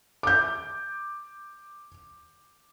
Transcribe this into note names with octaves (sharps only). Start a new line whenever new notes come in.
D6 G6